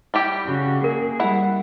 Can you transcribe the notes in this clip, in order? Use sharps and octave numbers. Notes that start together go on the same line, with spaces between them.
G3 E4 G4
C#3 F#4
A#3 G#4 A#4
G3 E4 F#5 B5